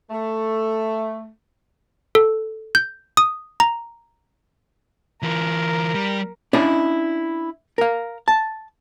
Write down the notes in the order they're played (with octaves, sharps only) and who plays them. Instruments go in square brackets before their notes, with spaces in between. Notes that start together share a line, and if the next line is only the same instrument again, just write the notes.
[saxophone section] A3
[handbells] A4
G6
D#6
A#5
[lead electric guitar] E3 F4 [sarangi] A#4
[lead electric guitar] G3
[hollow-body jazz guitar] C#4 D4 E4 D5 D#5
A#4 F5
A5